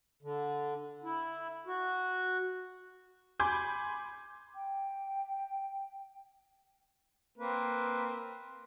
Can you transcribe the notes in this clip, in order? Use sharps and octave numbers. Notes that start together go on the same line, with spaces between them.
D3
E4
F#4
G#5 B5 C6 D6 G6 G#6
G5
A#3 C4 B4